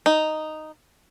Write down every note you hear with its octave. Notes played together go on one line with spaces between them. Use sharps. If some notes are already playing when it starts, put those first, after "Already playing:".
D#4